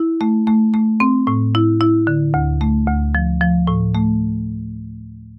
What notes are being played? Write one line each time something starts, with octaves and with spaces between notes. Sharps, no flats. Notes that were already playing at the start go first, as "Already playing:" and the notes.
Already playing: E4
A3
A3
A3
C4
A2
E4
E4
D3
D2
A3
D2
F3
F3
A2
A3